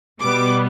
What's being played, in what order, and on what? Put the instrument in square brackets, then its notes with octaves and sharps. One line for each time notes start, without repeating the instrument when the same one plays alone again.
[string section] B2 G3 B3 D6